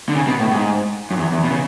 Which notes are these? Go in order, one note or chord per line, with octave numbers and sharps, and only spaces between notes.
D3
C#3
B2
A2
G#2
F#2
E2
E2
B2
C#3